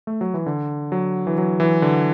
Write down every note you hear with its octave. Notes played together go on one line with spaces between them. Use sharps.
A3
F#3
E3
D3
F#3
E3
F#3
E3
D3